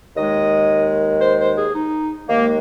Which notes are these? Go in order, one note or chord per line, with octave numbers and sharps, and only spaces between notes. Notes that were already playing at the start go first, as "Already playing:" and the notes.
D#2 D#3 G#3 D#5
C5
C5
G#4
D#4
D#2 D#3 G#3 A#3